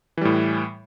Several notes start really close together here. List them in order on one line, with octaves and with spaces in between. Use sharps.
E3 G3 A2